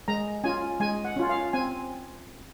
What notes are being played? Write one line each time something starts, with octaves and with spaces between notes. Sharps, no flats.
G#3 A#5
C#4 F4 G#5
G#3 G#5
F#5
C#4 F4
F5
C4 G#5